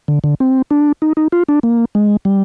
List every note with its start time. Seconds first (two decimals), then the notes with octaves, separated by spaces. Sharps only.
0.08 D3
0.24 D3
0.40 C4
0.71 D4
1.02 D#4
1.17 D#4
1.32 F4
1.49 D4
1.63 A#3
1.95 G#3
2.25 G3